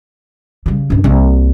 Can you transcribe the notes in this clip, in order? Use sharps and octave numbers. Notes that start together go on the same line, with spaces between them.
C#3 G3
C#2 G2
C2 A#3